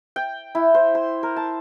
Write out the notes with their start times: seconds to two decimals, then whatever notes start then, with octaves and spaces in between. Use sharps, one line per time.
0.16 G5
0.55 E4
0.74 C5
0.95 C6
1.23 A#4
1.36 A5